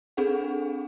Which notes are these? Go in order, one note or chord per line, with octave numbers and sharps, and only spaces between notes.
C4 D4 G#4 A4 F#5